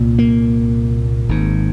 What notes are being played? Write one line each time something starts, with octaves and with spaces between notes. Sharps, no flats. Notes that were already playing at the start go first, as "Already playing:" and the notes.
Already playing: C2 A#2
A#3
G#1 G#2